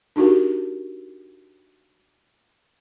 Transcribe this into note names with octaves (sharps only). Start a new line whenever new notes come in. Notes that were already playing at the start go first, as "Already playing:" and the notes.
D4 D#4 F#4 G4 A#4